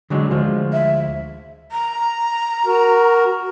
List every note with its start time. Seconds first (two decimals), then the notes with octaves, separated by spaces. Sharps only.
0.10 D3 F#3 G#3
0.30 D2 F3 G#3
0.73 E5
1.72 A#5
2.66 F#4 A#4